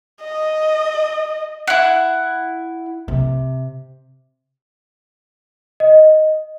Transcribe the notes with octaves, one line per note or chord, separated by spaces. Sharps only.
D#5
E4 F#5
C3
D#5